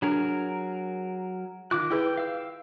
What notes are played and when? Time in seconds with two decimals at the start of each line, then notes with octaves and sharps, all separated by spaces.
0.02 F#3 D4 G#4 A#4
1.71 D#3 F4 D6 F#6
1.91 E4 G#4 B4 G5
2.17 F5 E6